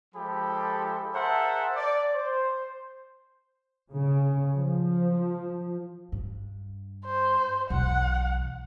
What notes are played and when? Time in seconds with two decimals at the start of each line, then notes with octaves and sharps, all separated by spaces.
0.15 F3 G#3 G4 A4 B5
1.13 G#4 A#4 C5 E5 F#5 A5
1.76 D5
2.15 C5
3.90 C#3
4.54 F3
6.12 G2
7.05 C5
7.70 B1 E2 F#5